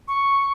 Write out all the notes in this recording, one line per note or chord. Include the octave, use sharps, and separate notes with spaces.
C#6